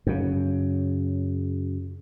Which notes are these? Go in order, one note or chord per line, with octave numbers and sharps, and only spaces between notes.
F#2 C#3